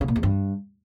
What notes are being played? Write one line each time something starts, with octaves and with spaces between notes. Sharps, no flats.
C#3
A#2
E2
G2